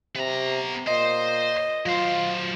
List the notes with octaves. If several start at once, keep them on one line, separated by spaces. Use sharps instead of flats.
C3 B3 A#5
A#2 C5 D#5
F#3 F4 C5